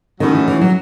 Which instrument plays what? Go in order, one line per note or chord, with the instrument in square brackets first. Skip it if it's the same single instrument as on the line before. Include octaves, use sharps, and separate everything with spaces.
[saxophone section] A2 F#3 C#4 [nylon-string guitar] D#3
[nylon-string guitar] E3
E3
F#3